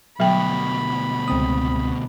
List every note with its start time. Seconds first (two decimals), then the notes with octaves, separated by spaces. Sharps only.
0.20 D2 B2 F#3 G5 B5
1.28 C#2 C4 D#6